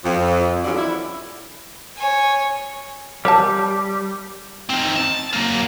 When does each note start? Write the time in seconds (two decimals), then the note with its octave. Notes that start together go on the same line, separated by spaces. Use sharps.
0.04 F2
0.63 E2 G2 D3 F#3 C#4 D5
0.77 E4
1.96 C#5 G#5
3.25 G3 A#4 C#5 A5
4.70 C4 D#4
4.97 A5
5.33 F#3 A#3